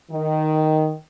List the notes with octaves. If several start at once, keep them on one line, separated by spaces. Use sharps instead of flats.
D#3